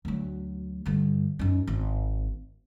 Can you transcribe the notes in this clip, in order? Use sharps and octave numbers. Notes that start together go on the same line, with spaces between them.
D2 F#3
G2 D3
F#2 D#4
G#1